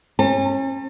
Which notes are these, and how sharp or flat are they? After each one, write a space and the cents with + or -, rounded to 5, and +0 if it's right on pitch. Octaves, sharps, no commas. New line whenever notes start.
C#4 -35 A5 +35